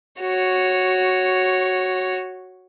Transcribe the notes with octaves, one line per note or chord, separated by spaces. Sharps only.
F#4 C#5